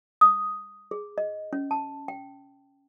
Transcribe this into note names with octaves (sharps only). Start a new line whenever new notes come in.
D#6
G#4
D#5
C#4
A5
G5